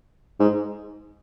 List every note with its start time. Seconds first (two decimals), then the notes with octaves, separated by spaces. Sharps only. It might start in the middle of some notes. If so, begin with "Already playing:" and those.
0.39 G#2